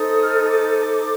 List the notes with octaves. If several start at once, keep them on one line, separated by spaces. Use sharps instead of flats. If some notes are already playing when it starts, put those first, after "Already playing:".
Already playing: D#4 A4 C5 D#6
F6
D#6
D6